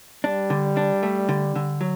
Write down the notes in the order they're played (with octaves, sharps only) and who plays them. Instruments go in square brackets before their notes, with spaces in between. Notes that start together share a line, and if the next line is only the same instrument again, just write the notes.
[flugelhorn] G3 [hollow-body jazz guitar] D4
[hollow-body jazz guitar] D3
D4
A3
D3
D3
F#3